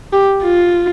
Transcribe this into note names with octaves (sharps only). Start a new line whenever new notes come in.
G4
F4